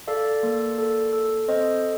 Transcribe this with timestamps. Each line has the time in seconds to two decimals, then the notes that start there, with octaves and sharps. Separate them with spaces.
0.07 A4 D5 F5
0.43 A#3
0.78 A4
1.13 A4
1.48 C4 C5 D#5